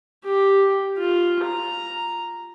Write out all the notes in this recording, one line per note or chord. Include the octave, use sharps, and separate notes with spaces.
G4
F4
A#5